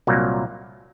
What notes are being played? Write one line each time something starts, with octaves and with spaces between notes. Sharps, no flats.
C2 A#2 F#3 A#3